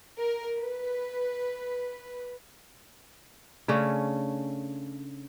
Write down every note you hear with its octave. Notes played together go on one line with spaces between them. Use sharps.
A#4
B4
C#3 A3 C#4 D4